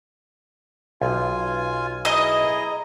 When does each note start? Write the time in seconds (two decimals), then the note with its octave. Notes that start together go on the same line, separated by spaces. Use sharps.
1.01 B1 F4 G#5
2.05 E4 G#4 D#5 A#5